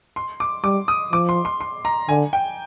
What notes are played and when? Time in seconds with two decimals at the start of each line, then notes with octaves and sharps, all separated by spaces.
0.16 C6
0.40 D6
0.64 G3 D6
0.88 D#6
1.12 F3 D6
1.29 C6
1.45 C6
1.61 C6
1.85 A#5
2.09 D3 G#5
2.33 G5